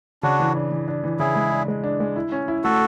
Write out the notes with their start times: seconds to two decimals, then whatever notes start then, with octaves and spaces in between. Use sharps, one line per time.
0.23 C#3 D4 F#4
0.40 E3
0.55 D4
0.71 E3
0.88 D4
1.04 E3
1.19 C#3 E4 G#4
1.35 G#3
1.52 D4
1.68 G#3
1.84 D4
2.00 G#3
2.16 E4
2.32 C#4
2.48 E4
2.64 A3 F#4 A4